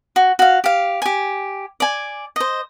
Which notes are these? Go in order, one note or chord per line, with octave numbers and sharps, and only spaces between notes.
F#4
F#4 F5
G4 F5
G4 G#5
D5 G#5
C5 D#5